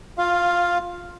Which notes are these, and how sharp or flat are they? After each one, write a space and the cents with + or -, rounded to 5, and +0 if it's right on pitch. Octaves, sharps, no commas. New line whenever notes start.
F4 +15 F5 +0